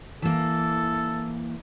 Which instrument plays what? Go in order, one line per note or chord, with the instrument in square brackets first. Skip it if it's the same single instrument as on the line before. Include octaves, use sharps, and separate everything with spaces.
[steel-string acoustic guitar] E3 A#3 [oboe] A4